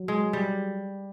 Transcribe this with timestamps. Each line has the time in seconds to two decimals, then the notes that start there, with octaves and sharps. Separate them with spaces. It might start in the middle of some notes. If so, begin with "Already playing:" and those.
Already playing: F#3
0.08 G#3
0.33 G3